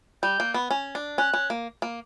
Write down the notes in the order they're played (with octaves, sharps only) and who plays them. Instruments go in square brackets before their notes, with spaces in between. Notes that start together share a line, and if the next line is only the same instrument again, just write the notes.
[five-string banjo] G3 [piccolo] G6
[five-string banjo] A#3
B3
C#4
D4
[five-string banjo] C#4 [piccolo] F#6
[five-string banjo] C#4
A#3
A#3